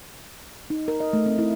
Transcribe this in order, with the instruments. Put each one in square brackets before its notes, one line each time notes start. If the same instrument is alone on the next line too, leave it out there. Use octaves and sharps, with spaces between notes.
[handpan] D#4
A#4
D#5
A3
C4
E4